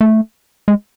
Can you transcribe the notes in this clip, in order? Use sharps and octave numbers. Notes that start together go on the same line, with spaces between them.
A3
G#3